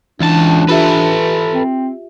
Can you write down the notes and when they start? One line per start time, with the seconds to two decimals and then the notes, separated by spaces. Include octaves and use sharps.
0.21 C#2 E3 D4 A5
0.69 F4 G4 A4 B4 E5
1.53 C4